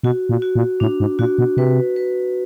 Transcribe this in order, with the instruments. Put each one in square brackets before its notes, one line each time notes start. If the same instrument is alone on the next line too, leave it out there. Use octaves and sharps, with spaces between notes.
[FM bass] B2 [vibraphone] F#4
[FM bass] A#2
[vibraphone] F#4
[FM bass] A#2
[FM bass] A2 [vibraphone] D4
[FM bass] G#2
[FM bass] A#2 [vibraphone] F#4
[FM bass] B2
[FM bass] C3 [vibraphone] B4
[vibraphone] B4